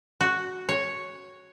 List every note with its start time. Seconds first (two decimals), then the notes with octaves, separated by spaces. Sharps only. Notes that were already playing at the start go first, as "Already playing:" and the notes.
0.21 F#4
0.69 C#5